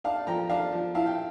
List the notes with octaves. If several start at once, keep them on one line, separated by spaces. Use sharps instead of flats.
D4 F5 A5
F3 G5 A#5
D4 F5 A5
F3
E4 F5 A5
G5